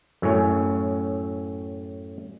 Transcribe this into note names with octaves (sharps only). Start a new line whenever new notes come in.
F#2 A2 C#4